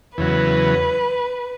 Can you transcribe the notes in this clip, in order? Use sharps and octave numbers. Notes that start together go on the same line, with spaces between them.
E2 C#3 F#3 B4